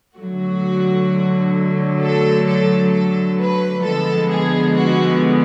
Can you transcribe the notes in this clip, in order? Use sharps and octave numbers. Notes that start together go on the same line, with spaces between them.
D3 F#3 A3 F#4
A4
A4
A4
B4
D3 F3 G#3 B3 A4
G#4
F#4